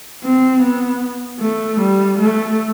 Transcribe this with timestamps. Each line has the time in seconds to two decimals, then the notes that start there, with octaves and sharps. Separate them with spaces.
0.24 C4
0.63 B3
1.41 A3
1.80 G3
2.19 A3